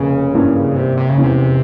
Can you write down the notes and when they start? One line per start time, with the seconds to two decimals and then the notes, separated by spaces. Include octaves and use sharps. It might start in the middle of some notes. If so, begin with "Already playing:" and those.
Already playing: F1 C#3 A#3
0.34 G#1 G2 E3 A#3 C#4
0.75 C3
0.97 C3
1.09 C#3
1.17 F1 E2 C3 E3 G#3 C#4